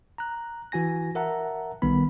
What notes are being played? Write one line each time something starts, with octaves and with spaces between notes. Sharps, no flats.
A#5 F#6
E3 F#4 G#5 A#6
A#4 E5 F#5 A5 A#5
B1 D#3 G3 B3 B5